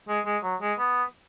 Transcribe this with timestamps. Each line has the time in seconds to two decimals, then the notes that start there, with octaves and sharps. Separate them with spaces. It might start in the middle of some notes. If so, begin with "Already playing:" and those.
0.08 G#3
0.25 G#3
0.43 F#3
0.61 G#3
0.79 B3